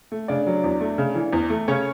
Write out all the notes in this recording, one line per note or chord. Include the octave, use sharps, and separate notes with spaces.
A3
C#3 D4 D5
F#3
E2
A3
C#3
E3
E2
A3
C#3 C#4 C#5